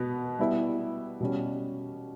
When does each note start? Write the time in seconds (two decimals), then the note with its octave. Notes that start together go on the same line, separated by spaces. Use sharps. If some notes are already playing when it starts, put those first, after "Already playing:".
Already playing: B2 B3
0.39 G3 B3 E4
1.21 B2 G3 C#4